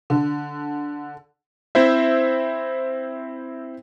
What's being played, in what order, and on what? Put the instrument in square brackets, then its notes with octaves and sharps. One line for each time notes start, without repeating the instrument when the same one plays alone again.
[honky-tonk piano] D3
[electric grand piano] C4 E4 C5 E5